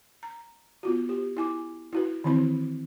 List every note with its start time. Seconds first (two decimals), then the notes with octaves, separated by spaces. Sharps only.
0.23 A#5
0.83 B3 F4 F#4
1.09 G4
1.37 E4 G#5 D6
1.93 E4 F#4 B4
2.24 D#3 E3 C4 E4 B5